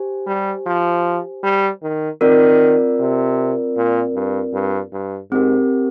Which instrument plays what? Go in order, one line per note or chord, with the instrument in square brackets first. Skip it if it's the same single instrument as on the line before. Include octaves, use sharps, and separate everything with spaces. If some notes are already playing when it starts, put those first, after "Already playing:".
Already playing: [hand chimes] G4 C5 G#5
[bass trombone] G3
F3
G3
D#3
[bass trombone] D#3 [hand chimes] C4 F4 A#4 D5
[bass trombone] C3
A#2
G2
G2
G2
[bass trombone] G#2 [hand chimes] C4 G4 A#4